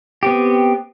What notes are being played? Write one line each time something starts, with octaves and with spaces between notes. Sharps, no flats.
B3 C4 G4